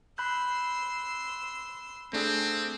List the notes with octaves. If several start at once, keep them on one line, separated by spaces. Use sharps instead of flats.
B5 C6 E6 F#6 G6
A3 C4 D4 G#4